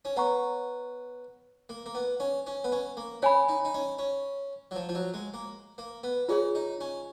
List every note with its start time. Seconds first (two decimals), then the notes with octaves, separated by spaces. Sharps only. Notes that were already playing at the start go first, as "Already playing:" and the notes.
0.05 C#4
0.16 B3 C#5 F#5 A#5 C#6
1.69 A#3
1.86 A#3
1.95 B3
2.20 C#4
2.47 C#4
2.64 B3
2.72 C#4
2.97 A#3
3.22 C#4 C#5 G#5 B5
3.49 D#4
3.65 D#4
3.74 C#4
3.99 C#4
4.71 F#3
4.76 F3
4.89 F3
4.95 F#3
5.14 G#3
5.34 A#3
5.78 A#3
6.04 B3
6.28 C#4 F4 G#4 C#5
6.55 D#4
6.81 C#4